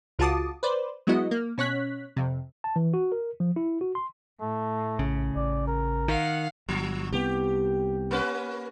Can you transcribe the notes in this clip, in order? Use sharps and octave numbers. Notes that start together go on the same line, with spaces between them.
C#2 F4 F#4 A5 D6 D#6
B4 C5 D5
F#3 G#3 B3 E4 F#4 D#5
A#3
B2 C#4 C#5 F#6 B6
F2 C3
A5
E3
F#4
A#4
F3
E4
F#4
C6
A2 A3
A#1 C#3
A1 D5
A#4
D#3 F5 F#5
G1 F3
C2 B3 G4
A#3 C#4 B4